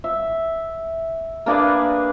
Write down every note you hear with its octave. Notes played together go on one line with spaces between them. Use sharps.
E5
A#3 D4 G#4 B4